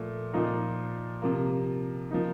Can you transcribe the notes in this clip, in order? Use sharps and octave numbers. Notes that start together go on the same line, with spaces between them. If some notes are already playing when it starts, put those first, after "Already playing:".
Already playing: A#2 F3 A3
A#2 F3 A#3 D#4
C3 F3 A#3
F3 A#3 D#4